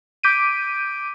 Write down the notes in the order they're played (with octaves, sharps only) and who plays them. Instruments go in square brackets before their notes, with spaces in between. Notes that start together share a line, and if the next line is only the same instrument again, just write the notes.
[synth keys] D6 G6 B6 D7 D#7